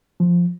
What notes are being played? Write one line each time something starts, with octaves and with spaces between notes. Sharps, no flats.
F3